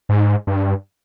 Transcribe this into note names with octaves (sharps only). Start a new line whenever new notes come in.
G#2
G2